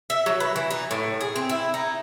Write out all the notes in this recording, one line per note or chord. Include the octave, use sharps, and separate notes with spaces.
E5
F#3
B4
E3
D#4
A2
G#4
C4
E4
D#4